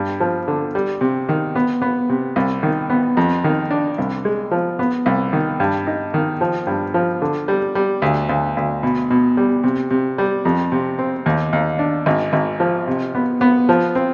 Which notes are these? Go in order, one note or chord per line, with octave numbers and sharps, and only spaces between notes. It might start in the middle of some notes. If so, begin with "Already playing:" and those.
Already playing: G2
F3
D3
G3
C3
D#3
B3
B3
C3
C2
D#3
B3
F2
D#3
D4
C2
G#3
F3
B3
C2
D#3
G2
D#4
D#3
F3
G2
F3
D3
G3
G3
D2
D2
D2
B2
B2
G3
C3
C3
G3
F2
C3
C4
D#2
D#2
D4
G#1
G#1
F3
C3
B3
B3
F3
C4